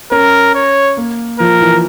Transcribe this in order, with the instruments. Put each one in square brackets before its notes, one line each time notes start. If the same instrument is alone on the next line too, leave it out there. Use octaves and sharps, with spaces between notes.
[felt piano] C#4 [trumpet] A#4
[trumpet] C#5
[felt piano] A#3
[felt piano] F3 [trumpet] A#4
[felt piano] E3